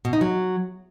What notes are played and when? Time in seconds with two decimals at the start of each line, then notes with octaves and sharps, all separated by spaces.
0.05 B2
0.13 D#4
0.21 F#3